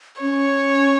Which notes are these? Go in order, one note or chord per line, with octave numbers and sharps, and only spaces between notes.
C#4 C#5